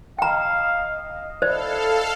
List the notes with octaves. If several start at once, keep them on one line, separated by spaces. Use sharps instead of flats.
D#5 F5 G5 A#5
E4 A4 C5 D5 F5